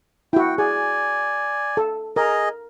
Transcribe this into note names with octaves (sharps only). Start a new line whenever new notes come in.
E4 F#4 G5
G#4 D5 G#5
A4
G#4 A#4 D#5